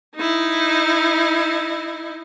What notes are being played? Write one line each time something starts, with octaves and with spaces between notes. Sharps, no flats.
D#4 E4